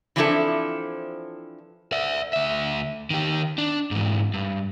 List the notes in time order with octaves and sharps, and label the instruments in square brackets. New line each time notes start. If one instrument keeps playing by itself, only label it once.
[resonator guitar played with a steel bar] E3 F3 C4 D4 E4 A4
[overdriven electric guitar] D5 E5
D2 E5
D#3 G4
D4
G#2 E3
G2